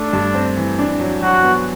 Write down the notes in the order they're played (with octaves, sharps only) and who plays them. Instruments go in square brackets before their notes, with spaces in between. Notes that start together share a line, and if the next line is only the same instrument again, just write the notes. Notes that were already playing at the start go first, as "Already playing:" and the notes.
Already playing: [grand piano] A3 [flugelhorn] D4
[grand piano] G2
C4
E3
D4
F#3
[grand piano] F#3 [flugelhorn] F#4
[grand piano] B3